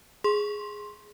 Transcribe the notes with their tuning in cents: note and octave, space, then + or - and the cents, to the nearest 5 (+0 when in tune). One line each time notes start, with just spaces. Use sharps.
G#4 +0 C6 +10